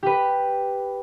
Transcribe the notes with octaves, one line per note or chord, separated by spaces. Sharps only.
G4 B4